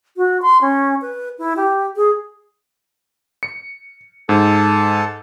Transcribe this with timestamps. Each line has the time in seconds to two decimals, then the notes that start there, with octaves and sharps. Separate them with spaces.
0.17 F#4
0.42 C6
0.61 C#4
1.02 B4
1.39 E4
1.57 G4
1.96 G#4
3.43 C#7
4.29 G#2 A4